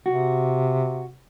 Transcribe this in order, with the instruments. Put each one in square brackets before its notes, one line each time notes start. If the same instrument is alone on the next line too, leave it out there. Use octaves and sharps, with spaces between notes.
[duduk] C3 [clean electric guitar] F#4